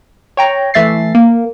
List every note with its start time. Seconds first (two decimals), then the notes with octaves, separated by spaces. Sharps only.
0.37 C#5 G5 A#5
0.74 E3 A3 E5 A6 C7
1.15 A#3